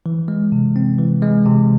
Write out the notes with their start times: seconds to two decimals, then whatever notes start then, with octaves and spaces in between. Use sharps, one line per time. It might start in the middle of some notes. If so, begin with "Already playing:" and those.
0.06 E3
0.28 G#3
0.52 C3
0.76 C4
0.98 E3
1.22 G#3
1.46 C3